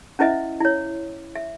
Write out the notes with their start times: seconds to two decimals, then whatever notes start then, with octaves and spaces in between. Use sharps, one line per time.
0.19 C#4 E4 B4 D#5 E5
0.60 E4 C#5
1.35 E5